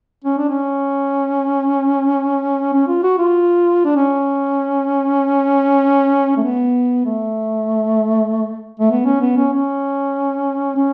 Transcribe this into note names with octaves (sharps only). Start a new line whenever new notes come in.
C#4
D4
C#4
C#4
F4
F#4
F4
D4
C#4
A3
B3
A3
A3
B3
C#4
B3
C#4
C#4
C#4